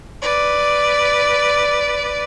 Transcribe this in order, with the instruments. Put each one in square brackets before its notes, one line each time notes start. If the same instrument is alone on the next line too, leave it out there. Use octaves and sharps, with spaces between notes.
[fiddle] B4 D5